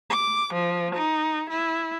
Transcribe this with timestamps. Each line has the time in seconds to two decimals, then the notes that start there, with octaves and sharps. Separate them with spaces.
0.10 D6
0.54 F3
0.95 D#4
1.50 E4